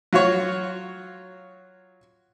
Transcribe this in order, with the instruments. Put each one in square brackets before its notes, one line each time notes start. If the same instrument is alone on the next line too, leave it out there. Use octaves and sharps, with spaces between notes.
[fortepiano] F#3 F4 F#4 C#5